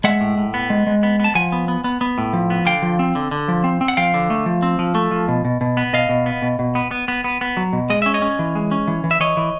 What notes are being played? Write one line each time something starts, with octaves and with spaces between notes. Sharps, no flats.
G#3 E5 F#5
A2
A2
B3
G#3
G#3
B3
B3 A5
F3 F#5 G#5
B3
B3
B3
B3
A2
F3
B3
D3 F5 G5
F3
C4
D3
D3
F3
C4
C4
F#5
F3 F5 G5
D3
A3
F3
C4
F3
A3
F3
B2
B2
B2
B3
B2 D#5 F5
B2
B3
B2
B2
B3
B3
B3
B3
B3
F#3
B2
G#3 D#5
C#4 E5
C#5 D#5
C#4
E3
G#3
C#4
E3
E3
E5
E3 C#5 D#5
E3